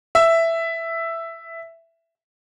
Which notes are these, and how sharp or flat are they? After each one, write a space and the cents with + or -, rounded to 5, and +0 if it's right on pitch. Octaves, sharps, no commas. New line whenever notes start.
E5 +5